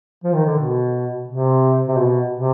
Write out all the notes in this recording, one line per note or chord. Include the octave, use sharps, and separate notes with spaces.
F3
D#3
D3
B2
C3
C3
B2
C3